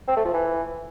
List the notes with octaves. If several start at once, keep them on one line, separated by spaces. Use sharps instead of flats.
C4
A3
F3
E3